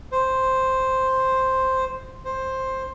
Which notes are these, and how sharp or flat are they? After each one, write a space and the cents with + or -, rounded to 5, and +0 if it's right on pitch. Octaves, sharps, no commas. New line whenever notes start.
C5 +0
C5 +10